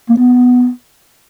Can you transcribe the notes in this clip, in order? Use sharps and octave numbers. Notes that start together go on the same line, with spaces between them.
A#3
B3